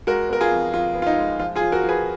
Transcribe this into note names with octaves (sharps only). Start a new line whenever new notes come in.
G#3 F#4 A#4
B3 A#4
F4 G#4
F2
F2 F4
B3
F4
D#4
G#3
F3 F4
F4 G#4
F3
F#4 A#4
F3
G#4 B4